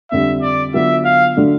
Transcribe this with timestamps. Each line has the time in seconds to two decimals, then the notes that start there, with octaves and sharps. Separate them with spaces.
0.10 F2 D3 G3 E5
0.42 D5
0.74 D3 F#3 B3 D4 F4 E5
1.05 F5
1.37 D3 F#3 A3 D4